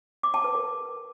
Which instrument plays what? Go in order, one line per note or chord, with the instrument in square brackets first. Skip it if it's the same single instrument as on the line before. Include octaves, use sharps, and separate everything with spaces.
[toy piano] D6
A5
B4
A#4